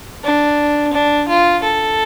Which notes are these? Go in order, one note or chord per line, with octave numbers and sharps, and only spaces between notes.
D4
D4
F4
A4